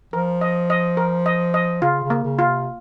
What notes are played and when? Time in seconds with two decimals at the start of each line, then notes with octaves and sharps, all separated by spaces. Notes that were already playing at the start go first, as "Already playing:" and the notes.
0.13 F3 A#4
0.41 D#5
0.70 D#5
0.97 A#4
1.26 D#5
1.54 D#5
1.82 C#3 F4
2.03 C#3
2.10 A#3
2.24 C#3
2.39 F4
2.46 C3